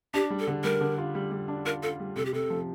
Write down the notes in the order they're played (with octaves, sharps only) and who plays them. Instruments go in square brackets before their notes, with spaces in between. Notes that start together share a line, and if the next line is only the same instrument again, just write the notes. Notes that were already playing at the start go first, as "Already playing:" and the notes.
[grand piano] D4 [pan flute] G4
[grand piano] G3
[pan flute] A4
[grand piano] D3
[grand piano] G3 [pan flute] A#4
[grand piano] D3
F4
G3
G3
D4
[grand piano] F4 [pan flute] A#4
[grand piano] F4 [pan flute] A4
[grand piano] G3
[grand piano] C3 [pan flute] A4
[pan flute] G4
[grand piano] C3 [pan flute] A4
[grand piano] F3